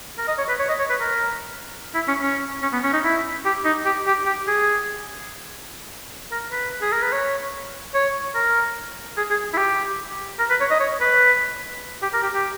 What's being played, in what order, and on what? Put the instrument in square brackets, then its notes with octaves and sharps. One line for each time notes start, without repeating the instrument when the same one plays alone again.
[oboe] A#4
D#5
C#5
B4
C#5
D#5
C#5
B4
A#4
E4
C#4
C#4
C#4
B3
C#4
D#4
E4
G4
D#4
G4
G4
G4
G#4
A#4
B4
G#4
A#4
B4
C#5
C#5
A#4
G#4
G#4
E4
G4
A#4
B4
C#5
D#5
C#5
B4
G4
A#4
G4
G4